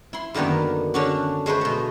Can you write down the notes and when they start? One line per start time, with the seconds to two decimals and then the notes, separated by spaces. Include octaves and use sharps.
0.13 E4 C6
0.34 F#2 D3 D#3 A#3 B3
0.94 D3 C#4 D4 F#4
1.46 G#3 A3 B4 C5
1.61 B2 A3